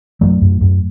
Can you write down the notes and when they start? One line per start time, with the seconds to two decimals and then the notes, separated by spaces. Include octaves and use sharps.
0.21 F#2 F#3 A3
0.41 F#2
0.61 F#2